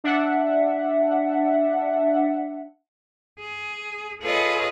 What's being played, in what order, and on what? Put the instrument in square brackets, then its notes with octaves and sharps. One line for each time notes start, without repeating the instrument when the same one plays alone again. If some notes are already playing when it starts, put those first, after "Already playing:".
[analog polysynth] D4 E5 F#5
[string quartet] G#4
F4 G#4 A4 B4 C#5 D#5